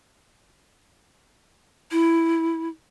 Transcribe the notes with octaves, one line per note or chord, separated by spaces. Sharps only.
E4